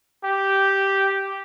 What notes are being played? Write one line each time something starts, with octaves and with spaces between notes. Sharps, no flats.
G4